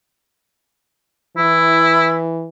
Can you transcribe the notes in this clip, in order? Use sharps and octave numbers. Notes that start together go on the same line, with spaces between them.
E3 E4